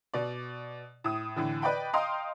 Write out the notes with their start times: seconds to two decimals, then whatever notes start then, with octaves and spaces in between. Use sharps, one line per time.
0.14 B2 D5
1.04 A2 D#6
1.36 A2 D3 E3
1.62 B4 D5 D#5 G5 B5
1.93 D#5 F5 G5 A#5 C6 D#6